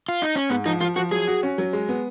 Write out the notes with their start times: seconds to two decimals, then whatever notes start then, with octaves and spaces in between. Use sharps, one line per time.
0.09 F4
0.22 D#4
0.36 C#4
0.50 G#2 B3
0.65 F3 D#4
0.81 F3 F4
0.96 F3 F#4
1.11 F#3 G#4
1.27 F#4
1.43 C#4
1.58 F#3
1.73 G#3
1.89 B3